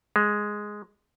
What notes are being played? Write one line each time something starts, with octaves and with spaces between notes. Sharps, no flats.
G#3